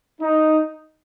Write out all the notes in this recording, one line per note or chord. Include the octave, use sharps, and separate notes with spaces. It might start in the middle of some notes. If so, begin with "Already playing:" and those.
D#4